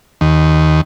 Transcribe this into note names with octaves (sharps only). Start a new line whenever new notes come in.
D#2